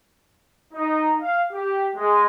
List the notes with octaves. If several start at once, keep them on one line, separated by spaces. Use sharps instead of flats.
D#4
F5
G4
G#3